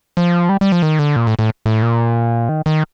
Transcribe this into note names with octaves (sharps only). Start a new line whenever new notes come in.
F3
G3
G3
F3
D#3
D3
A#2
A2
A2
A2
A#2
D#3
D#3